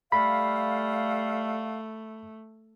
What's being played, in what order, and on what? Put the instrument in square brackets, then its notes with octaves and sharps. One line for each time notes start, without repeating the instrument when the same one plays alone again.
[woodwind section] G3 A4 F5 [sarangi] A3 [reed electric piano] B5